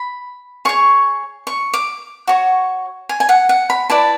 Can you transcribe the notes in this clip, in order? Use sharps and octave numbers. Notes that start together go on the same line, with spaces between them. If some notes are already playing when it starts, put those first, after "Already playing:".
Already playing: B5
G#4 C#5 C#6
C#6
D6
F#4 C#5
G#5
G#5
F#5
F#5
B5
E4 B4 D5 A5